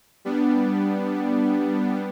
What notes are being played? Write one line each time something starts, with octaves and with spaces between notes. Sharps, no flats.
G3 B3 D4